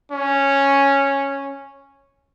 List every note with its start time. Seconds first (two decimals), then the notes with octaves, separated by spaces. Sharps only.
0.11 C#4